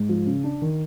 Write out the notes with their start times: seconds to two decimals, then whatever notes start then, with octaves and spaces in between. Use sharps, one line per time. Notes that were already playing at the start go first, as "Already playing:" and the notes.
Already playing: G#2
0.09 F3
0.27 C#3
0.44 D4
0.62 D#3